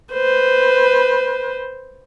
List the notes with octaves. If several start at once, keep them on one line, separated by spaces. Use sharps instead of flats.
B4 C5